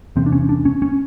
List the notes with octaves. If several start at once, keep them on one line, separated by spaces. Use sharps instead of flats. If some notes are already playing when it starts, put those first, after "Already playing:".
E2 C3 C4
D4
C#4
D4
C#4
C#4